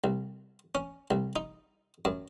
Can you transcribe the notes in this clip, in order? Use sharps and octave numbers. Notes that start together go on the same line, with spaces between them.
C2
C#4
C2
D#4
F#2